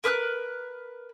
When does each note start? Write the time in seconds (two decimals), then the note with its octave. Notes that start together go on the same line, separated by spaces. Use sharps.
0.04 A#4 B4 E6 F#6